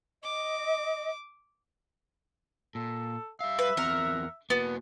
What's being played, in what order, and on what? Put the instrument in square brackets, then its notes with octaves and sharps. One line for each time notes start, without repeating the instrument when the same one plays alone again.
[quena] D#5 [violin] D6
[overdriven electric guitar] A#2 [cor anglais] A4
[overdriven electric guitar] G3 F5 [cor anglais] E5
[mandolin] B4
[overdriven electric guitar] E2 C4 [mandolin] A#4 F#5
[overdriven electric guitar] A#3 F#4 [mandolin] B3